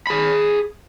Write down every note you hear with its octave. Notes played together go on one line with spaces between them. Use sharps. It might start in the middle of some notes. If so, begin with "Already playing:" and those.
G#4 B5